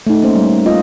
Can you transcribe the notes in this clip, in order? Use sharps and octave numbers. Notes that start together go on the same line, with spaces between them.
A3 D#4
A#3 C#4 C5
G3
F4 D#5